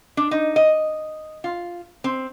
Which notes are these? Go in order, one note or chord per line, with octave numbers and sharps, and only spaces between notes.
D4
D#4
D#5
F4
C4